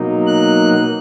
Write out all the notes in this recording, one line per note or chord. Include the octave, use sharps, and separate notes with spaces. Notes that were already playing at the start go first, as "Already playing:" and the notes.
Already playing: B2 F#3 A#3 D#4
F#6